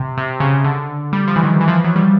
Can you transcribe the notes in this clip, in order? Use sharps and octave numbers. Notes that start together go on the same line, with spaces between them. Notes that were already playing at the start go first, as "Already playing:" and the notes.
Already playing: C3
C3
C#3
D3
G3
F3
E3
D#3
E3
F3
E3
F#3
G3